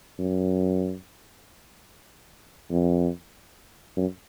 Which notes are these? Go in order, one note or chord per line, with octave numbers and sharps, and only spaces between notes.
F#2
F2
F#2